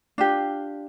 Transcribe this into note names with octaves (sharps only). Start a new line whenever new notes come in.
D4 F4 G4